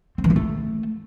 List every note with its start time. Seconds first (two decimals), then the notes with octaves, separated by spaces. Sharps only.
0.18 C4
0.24 E3
0.30 C4
0.36 A3